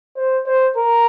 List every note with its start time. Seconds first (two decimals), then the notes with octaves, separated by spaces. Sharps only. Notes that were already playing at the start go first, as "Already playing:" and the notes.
0.16 C5
0.46 C5
0.76 A#4